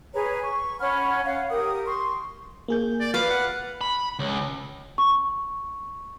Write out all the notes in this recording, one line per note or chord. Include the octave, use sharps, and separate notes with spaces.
G#4 B4 C#5 A#5
C#6
C#4 F#5 B5 F6
C#5 F5 F#5
G4 A#4 D#6
C6 C#6
A#3 G#4 G6
D5
B4 F5 D6
F#5
B5
C#2
C#6